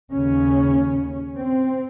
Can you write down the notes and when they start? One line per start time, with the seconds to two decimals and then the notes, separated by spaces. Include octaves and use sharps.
0.13 D#2 C#3 C#4
1.37 C4